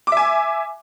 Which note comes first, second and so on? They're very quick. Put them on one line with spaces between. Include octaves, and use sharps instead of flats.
D6 E5 G#5